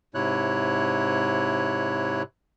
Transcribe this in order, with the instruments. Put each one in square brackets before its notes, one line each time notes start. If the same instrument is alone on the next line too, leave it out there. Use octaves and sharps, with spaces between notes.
[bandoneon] G#2 C3 E4 C#5 F#6